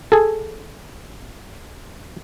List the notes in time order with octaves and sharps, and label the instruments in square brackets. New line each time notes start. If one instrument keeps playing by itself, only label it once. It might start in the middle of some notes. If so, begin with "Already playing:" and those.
[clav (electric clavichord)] G#4 A4